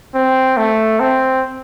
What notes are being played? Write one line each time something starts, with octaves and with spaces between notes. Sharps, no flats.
C4
A3
C4